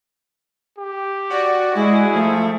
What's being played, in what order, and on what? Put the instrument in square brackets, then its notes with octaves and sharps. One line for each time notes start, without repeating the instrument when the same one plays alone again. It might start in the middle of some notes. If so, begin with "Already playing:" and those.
[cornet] G4
[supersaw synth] F#4 [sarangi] D5
[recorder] G#3 [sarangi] E4 [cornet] G#4
[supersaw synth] F3 [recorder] A3